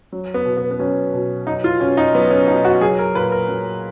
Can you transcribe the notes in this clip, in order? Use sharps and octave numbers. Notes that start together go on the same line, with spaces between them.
F#3
B3
B2
B3
B3
F#3 C#4
B2
F#3 D#4
F4
B2 C#4
D#4
F#3 B3
C#4
B2 D#4
F#4
F#3 G#4
A#4
A#2 B4
A#4
F#3